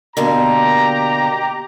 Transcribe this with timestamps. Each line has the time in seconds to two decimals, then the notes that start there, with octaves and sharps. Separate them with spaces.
0.17 B2 D3 A#3 G4 A#5